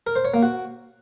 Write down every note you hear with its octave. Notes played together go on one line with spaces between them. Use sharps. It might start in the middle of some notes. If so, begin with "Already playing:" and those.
A#4
C5
C#5
A#3
F#4